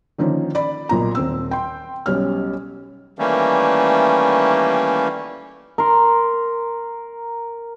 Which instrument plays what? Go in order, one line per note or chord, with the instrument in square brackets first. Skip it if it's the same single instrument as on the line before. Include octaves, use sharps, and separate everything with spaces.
[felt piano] D3 D#3 F3 A#3 C#4 D#4
D5 B5
B1 A#2 A#5
D#1 C4 E6
G5 C6
B1 G3 C#4 F6
[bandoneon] D#3 E3 G3 A3 A#3 C#4
[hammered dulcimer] A#4 C6